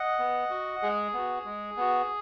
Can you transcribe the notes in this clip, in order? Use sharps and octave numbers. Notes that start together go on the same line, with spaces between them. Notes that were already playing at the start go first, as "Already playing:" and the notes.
Already playing: D#5 F#5
B3
F#4
G#3 G#4
B3 F#4
G#3
B3 F#4